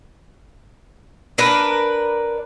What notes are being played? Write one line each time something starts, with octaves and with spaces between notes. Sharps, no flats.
D4 A#4 B4